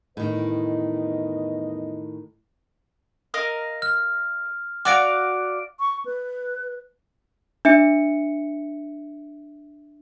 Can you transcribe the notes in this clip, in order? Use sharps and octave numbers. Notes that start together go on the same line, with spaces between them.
E2 A2 D#3 B4 D#5
A#4 D#5 F5
F6
F#4 D5 F5 D6 D7
C#6
B4
D4 E5 C#7